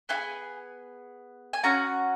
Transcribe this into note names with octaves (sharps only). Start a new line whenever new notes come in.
B3 F4 G#4 G#5
G#5
C#4 F#4 A#5